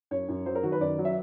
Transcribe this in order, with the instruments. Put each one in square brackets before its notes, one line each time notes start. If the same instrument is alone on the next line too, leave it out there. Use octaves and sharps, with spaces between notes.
[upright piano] F#2 C#5
F#2
F#3 C5
A#4
D#3 F#4
B4
F#2 D5
F#3
E5